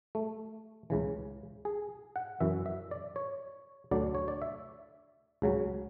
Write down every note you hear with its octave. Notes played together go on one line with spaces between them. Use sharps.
A3
C#2 C#3 E3
G#4
F#5
F#2 E3 E5
E5
D5
C#5
D2 D3 F#3 D5
C#5
D5
E5
C#2 C#3 F#3